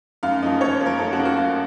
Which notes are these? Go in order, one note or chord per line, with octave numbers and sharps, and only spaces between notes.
F#2 F5
F3 A#3 D#5
F#2 C#5
C5
F3 A#3
A#4
F#2 A4
F#4
F3 A#3
F#4
F#2 F4